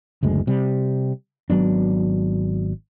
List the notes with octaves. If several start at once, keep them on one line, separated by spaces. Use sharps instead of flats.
F#1 D2 G#3
C3 G3
G#1 F#3 B3 D4